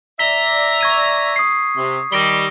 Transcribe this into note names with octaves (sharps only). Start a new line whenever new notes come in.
D5 E5 A#5 B6 G7
C#6 G#6 D#7
D#6 C7
C3
D#3 G3 A#6 D7 G7